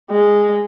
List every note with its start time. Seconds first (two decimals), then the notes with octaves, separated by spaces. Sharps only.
0.11 G#3